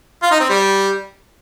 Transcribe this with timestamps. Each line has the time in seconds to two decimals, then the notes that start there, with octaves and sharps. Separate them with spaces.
0.22 F4
0.31 D#4
0.40 C4
0.49 G3